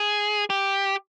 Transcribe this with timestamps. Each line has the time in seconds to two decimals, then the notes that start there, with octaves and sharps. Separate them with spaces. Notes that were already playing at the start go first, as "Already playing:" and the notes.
Already playing: G#4
0.50 G4